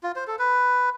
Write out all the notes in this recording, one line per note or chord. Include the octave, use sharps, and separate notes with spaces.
F4
C5
A4
B4